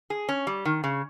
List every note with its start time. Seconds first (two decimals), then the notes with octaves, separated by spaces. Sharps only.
0.10 G#4
0.29 C#4
0.47 G3
0.65 D#3
0.84 C#3